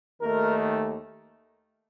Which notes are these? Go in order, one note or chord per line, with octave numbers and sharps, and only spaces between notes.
D#2 D#3 A3 A#4